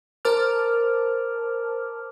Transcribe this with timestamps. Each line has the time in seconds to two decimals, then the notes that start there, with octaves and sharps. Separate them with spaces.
0.25 A#4 C5 A5 D6 F6